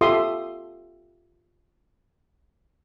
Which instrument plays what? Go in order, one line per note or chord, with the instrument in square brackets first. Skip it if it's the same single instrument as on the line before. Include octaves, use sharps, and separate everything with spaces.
[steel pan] F4 G4 A4 E5 C6 D#6